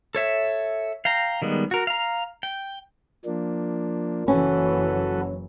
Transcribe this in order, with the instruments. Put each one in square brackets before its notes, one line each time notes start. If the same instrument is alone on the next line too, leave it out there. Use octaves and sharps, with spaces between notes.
[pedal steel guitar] A4 C#5 E5
F5 G5 A#5
D#3 G3 G#3 B3
F#4 A#4
F5 A#5
G5
[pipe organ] F3 A#3 D4
[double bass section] F#1 E3 F#3 [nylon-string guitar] C#4 [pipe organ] F#4 A4 B4